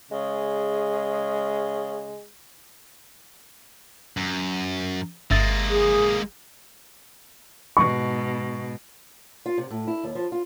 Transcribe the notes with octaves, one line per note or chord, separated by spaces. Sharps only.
C#3 G#3
F#2
G1 G#3 A#3 E5 A6
G#4
G#2 B2 C#6
F4
C3
A2
E4
D#2
F3
F4